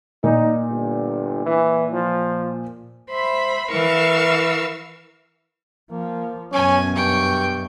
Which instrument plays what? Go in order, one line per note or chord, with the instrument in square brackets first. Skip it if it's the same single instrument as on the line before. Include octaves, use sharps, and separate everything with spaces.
[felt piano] A#2 [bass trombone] D#4
[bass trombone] G1
E3
F3
[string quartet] C5 E5 B5
E3 A#4 F5 C#6 E6
[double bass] F3 [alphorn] A#3
[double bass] F#2 B2 [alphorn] C#4 [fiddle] G#5
[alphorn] G2 [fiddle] G5 C#6